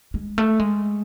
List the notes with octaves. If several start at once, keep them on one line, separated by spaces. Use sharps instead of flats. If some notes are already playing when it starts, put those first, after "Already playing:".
G#3
A3
G#3